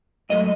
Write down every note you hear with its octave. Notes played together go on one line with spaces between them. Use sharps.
G#2 F#3 A3 D#5